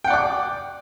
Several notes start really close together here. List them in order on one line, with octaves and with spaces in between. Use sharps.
G5 F#5 D5 D6